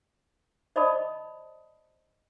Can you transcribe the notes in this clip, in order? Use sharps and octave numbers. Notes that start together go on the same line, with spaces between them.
C5 D5 D#5 A5 B5 D#6